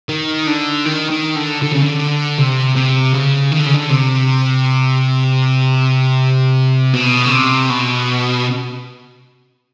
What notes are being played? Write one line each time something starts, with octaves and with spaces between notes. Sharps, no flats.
D#3
D3
D#3
D#3
D3
D3
C#3
D3
C3
C3
C#3
D#3
D3
C#3
D3
C3
B2
C#3
C3
B2